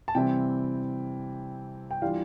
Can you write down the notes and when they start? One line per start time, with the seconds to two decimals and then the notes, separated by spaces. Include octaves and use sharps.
0.08 A5
0.15 C3 E3 G3 C4 E4 G5
1.91 G5
2.02 E3 G3 D4 F4 F5